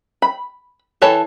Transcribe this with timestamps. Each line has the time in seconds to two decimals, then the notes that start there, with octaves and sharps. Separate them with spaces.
0.22 B5
1.02 E3 A4 C#5 A5